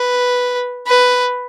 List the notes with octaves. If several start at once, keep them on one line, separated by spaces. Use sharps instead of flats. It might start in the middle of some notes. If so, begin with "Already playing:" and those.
Already playing: B4
B4